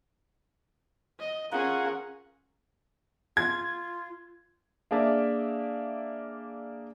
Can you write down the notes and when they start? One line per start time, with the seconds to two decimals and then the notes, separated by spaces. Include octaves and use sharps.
1.19 D#5
1.52 C#4 F4 G#4 A#4 F#5
3.37 F4 G#6
4.91 A#3 D4 G#4 A#4 D5 E5